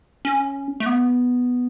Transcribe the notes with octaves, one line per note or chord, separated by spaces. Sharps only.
C#4
A3
B3